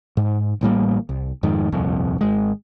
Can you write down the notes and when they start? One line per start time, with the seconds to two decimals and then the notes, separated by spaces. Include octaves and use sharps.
0.17 G#2
0.61 A1 A2 G3 A#3
1.09 C2
1.43 F2 G#2 D#3
1.72 D#1 C2 F2
2.21 G#1 G#3